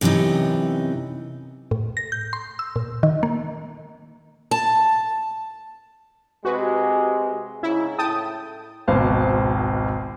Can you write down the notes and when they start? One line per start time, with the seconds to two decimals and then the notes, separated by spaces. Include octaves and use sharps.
0.01 F#2 C3 E3 B3 D#4
1.71 A2
1.97 A#6
2.12 G6
2.33 C6
2.59 E6
2.76 A#2
3.03 D#3
3.23 A#3
4.51 A5
6.45 C3 G#3 F#4 B4
7.63 G#2 C#3 E4
7.99 A2 G5 A5 D#6
8.88 G#1 C#2 B2 C5 F5